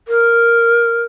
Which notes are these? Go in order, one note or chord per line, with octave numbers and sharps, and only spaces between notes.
A#4